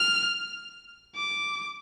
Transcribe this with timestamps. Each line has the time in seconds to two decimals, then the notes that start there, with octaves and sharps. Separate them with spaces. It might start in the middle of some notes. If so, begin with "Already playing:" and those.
Already playing: F6
1.15 D6